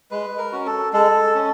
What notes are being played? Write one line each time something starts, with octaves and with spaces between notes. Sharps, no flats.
G#3 B4
A#4
C#4 F#4
A4
G#3 A4
C#4